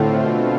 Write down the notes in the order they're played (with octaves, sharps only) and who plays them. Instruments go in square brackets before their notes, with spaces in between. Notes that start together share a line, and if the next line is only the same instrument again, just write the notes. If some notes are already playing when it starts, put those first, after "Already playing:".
Already playing: [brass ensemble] A2 [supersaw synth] D3 A3 C4 F4
[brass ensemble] B2